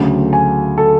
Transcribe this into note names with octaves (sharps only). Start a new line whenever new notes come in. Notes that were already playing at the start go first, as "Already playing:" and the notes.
Already playing: D2 C#3 F#3 A3
G#5
A4